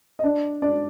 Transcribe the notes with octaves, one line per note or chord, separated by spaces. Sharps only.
D#5
D4 D5
D4 D5